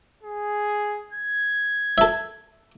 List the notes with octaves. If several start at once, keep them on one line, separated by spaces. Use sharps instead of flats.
G#4
G#6
A4 E5